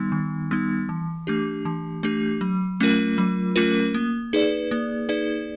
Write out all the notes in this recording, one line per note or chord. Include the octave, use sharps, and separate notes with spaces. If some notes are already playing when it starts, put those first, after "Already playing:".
Already playing: D#3 G3 B3 D#4
D#3
G3 B3 D#4
E3
A3 D4 G4
E3
A3 D4 G4
F#3
A3 C#4 F4 A#4
F#3
A3 C#4 F4 A#4
A#3
D#4 G#4 B4 D5
A#3
D#4 G#4 B4 D5